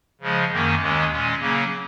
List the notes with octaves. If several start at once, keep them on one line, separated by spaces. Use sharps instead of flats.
C#3 F3 G#3
F#2 D#3 A#3 C#4
D#2 D#3 G#3 C#4
A#2 G#3 C#4
C#3 F#3 A#3 C#4